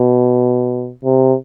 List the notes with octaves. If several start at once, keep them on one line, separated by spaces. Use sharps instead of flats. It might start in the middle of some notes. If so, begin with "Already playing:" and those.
Already playing: B2
C3